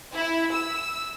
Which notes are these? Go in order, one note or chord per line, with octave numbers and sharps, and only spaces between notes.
E4
E6